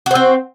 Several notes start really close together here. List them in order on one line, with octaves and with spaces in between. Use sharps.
F#4 C5 C4